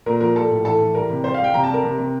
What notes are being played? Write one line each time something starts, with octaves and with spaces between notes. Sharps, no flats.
A#2 A#4
F3 A#4
G3 A4
A2
E3 A4
E3
G3 A#4
C3
G3 C5
F5
G3
G5
C3 A#5
A5
G3
A#4
C3
C3